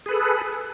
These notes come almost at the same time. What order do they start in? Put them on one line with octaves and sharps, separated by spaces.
G#4 B4 A4